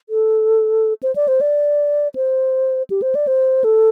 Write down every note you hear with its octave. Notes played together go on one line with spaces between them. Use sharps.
A4
C5
D5
C5
D5
C5
G4
C5
D5
C5
A4